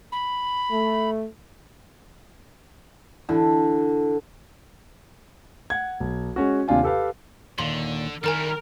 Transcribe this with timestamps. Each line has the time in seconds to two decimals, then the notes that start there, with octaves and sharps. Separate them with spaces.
0.12 B5
0.71 A3
3.29 D3 E3
5.70 F#5 G#6
6.00 B1
6.36 G#3 C#4 F#4
6.68 D#2 C3 D4 F4 G#5
6.83 G4 A4 B4 F5
7.59 D#2 A#2 D3 D#3 C6
8.24 D#3 G3 E4 A#4 G#5 A#5 F6